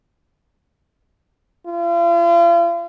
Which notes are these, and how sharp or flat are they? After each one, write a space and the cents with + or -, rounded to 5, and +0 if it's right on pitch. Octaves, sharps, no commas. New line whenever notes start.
F4 -40